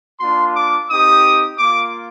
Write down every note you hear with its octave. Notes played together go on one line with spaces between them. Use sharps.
A#3 D4 F4 C6
D6
C4 D#4 G4 D#6
A#3 F4 D6